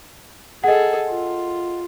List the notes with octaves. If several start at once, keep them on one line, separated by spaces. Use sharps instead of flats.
G#4 A4 D#5 F#5
F4